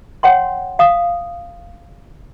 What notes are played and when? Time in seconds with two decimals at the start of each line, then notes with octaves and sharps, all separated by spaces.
0.23 C#5 F#5 G5 C6
0.79 F5 D#6